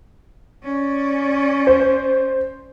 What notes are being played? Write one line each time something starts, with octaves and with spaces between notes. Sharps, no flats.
C#4 D5
C5